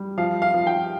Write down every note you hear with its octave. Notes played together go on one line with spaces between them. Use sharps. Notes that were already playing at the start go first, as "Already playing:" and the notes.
Already playing: G3
F3 F5
F5
F3
G5